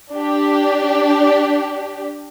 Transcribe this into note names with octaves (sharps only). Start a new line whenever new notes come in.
D4 G4